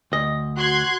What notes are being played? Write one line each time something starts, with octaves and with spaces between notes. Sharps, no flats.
D2 D#5
F#4 C6 F#6 G#6